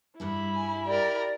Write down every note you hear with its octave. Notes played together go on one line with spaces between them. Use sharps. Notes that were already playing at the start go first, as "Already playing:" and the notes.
G2 G3 E4 G#4 B5
G#5
G4 A#4 D5